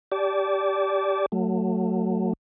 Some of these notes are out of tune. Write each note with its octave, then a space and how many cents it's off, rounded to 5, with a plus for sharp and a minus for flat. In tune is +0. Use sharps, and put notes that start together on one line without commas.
G4 +0 D5 -20 A5 -30
F#3 +0 A3 +25